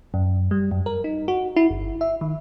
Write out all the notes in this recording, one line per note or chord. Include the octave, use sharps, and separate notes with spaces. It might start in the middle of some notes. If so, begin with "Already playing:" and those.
F#2
G3
F#2
A#4
D#4
F#4
E4
G1
E5
D#3